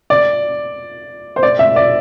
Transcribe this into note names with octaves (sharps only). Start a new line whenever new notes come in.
D5
C5
D5
E5
D5